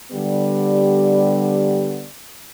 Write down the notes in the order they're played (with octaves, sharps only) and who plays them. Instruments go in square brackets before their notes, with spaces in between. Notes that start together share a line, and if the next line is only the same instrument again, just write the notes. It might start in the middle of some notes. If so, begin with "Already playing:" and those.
[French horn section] D3 G3 B3 G4 D5